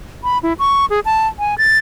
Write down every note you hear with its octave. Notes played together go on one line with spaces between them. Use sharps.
B5
E4
C#6
G#4
A5
G#5
A6